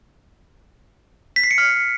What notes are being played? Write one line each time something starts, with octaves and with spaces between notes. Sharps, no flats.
B6
C7
C#7
F6